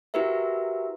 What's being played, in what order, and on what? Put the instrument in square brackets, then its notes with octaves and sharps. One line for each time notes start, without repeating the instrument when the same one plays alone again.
[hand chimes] E4 F#4 G4 A#4 B4 E5